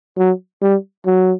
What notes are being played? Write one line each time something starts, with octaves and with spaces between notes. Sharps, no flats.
F#3
G3
F#3